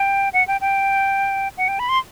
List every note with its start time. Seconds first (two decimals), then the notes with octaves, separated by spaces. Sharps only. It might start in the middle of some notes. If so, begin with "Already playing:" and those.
Already playing: G5
0.33 F#5
0.47 G5
0.61 G5
1.58 F#5
1.68 G5
1.79 B5
1.89 C6